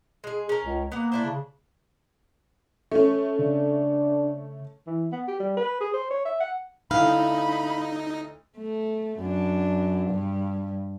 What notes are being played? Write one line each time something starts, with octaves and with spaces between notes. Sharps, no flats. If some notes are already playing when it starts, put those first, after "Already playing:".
G#3 G#4
C#4 A#4
C#2
A#3 B3 F#5
D4 E4 C5
C#3
A3 C#4
C#3 D4
E3
B3
G4
G3
B4
G#4
C5
C#5
E5
F#5
D2 D#4 E4 F5 B5 F6
A3
F#2 D4
G2